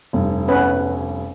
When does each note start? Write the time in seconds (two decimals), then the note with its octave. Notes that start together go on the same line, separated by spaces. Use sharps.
0.13 F1 G2
0.48 B3 C#4 B4